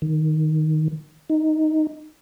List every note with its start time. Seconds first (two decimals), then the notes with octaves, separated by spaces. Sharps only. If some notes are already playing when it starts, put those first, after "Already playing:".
0.02 D#3
1.30 D#4